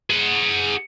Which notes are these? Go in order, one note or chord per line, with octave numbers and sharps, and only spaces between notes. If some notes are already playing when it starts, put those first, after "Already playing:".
G#4 F#5